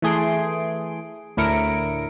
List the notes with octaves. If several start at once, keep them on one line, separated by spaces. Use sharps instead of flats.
E3 A3 G#4 C6 D7
D2 A2 E4 A#4 C#7 D7